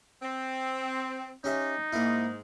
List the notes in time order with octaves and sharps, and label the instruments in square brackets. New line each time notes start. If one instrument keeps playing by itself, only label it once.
[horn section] C4
[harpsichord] C#4 G4 E5 [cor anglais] D#4
[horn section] G#2 [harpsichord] A#3 E4